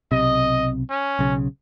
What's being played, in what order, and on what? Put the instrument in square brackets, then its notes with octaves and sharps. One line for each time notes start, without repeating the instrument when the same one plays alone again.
[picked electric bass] B1 C3 [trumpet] D#5
[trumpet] C#4
[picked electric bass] B1 C#3